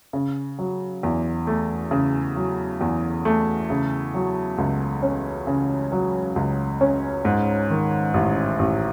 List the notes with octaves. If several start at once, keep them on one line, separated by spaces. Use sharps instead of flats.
C#3
F#3
E2
A3
C#3
F#3
E2
A3
C#3
F#3
C#2
C#4
C#3
F#3
C#2
C#4
G#2
D#3
A1
A1